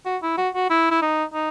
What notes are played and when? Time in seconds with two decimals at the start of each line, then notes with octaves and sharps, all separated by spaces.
0.06 F#4
0.23 E4
0.38 F#4
0.55 F#4
0.70 E4
0.91 E4
1.02 D#4
1.34 D#4